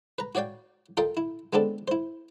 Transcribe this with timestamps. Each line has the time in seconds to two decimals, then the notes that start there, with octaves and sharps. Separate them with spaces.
0.18 B4 A#5
0.35 F#4 C#5 D5 F5 G5
0.97 F4 A4 A#4 D#5 F5 G5
1.17 E4
1.53 G#3 B3 C4 D4 A4
1.88 E4 C5